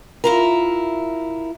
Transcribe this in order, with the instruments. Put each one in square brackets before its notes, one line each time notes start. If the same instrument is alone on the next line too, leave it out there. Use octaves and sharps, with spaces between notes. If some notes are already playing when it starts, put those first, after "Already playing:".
[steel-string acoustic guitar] E4 F4 A#4